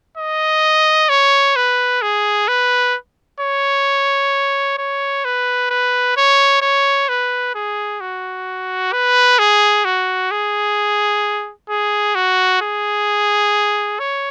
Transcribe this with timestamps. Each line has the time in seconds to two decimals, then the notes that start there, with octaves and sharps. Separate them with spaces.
0.17 D#5
1.09 C#5
1.56 B4
2.02 G#4
2.48 B4
3.40 C#5
4.78 C#5
5.25 B4
5.70 B4
6.17 C#5
6.62 C#5
7.09 B4
7.55 G#4
8.01 F#4
8.92 B4
9.39 G#4
9.85 F#4
10.31 G#4
11.69 G#4
12.15 F#4
12.61 G#4
13.99 C#5